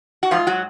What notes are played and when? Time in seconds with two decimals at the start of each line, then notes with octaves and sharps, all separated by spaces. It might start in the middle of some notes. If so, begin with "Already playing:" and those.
0.23 F#4
0.31 G#2 F3 F4
0.47 F#3 F#4